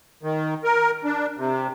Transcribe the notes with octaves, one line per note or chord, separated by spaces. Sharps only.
D#3
A#4
D4
C3